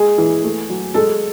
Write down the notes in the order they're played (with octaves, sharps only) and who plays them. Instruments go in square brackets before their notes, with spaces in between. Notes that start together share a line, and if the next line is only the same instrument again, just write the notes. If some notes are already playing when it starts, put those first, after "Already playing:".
Already playing: [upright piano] G#3 G#4
E3
A3
F#3
G#3 A4